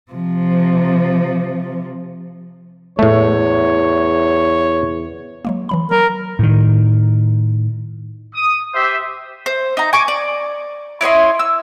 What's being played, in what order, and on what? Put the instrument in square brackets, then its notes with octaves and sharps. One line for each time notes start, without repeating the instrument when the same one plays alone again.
[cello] C3 F3
[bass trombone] E2 [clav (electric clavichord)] A2 A3 [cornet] C#5
[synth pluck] F#3 G#3 A#3
E3 F#3 B5
[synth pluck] F#3 [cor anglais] A#4
[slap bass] A2 D#3
[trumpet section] D#6
G4 C5 E5
[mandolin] C5
D#4 A#5
G#5 C#6 D6
D5
E4 C#5 D#5 C6
E6